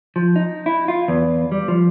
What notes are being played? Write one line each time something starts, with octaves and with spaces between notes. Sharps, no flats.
F3
D#4
E4
F4
E2
G3
F3